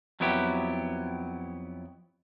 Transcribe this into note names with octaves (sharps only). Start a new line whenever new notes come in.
F2 F#3 B3 E4 G4